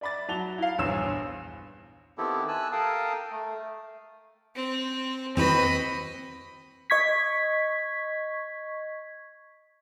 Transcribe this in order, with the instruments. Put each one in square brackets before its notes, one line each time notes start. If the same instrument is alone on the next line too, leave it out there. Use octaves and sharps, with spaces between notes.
[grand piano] D5 E5 B5 D6 A6
F#3 A5 F7 G7
E4 F5
A#1 E2 G2 C#5 E6 E7
[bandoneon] D#3 B3 C4 E4 G4 A4
G#5 A5 E6 F#6
A4 A#4 F5 G5 A5 D#6
A3
[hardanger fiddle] C4
[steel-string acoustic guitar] C4 F#4 B4 [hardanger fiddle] D#5 B5
[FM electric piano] D#5 C#6 G#6 B6